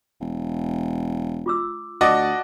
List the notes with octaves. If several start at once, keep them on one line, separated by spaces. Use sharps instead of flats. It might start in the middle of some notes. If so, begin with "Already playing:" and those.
E1
F4 D6 E6
D2 F#4 D5 D#5 A5 D6